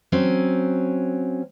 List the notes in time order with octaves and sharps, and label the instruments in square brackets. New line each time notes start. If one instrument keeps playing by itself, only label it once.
[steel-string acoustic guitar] F#3 C4 C#4